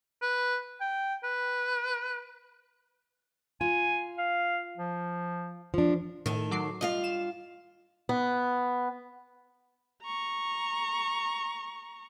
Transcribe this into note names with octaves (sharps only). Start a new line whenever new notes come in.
B4
G5
B4
F4 G#5
F5
F3
F3 D4
A2 D#3 A4
F#3 D6 C7
G2 F4 D#5 F5
E7
B3
A#5 C#6